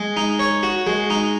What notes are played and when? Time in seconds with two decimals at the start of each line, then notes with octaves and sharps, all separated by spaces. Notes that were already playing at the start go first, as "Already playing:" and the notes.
Already playing: G#3
0.17 D#4
0.39 C#5
0.63 F#4
0.87 G#3
1.10 D#4